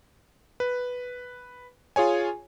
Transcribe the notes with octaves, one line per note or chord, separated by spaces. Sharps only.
B4
F4 G#4 C#5 G#5